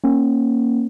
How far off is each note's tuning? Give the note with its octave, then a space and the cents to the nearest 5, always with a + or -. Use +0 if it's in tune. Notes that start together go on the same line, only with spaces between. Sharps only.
A#3 +0 C#4 -20